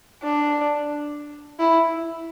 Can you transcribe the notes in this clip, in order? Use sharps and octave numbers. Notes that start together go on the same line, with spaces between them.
D4
E4